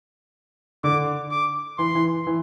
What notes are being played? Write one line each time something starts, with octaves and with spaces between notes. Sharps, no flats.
D3 D6
D6
E3 C6
E3
E3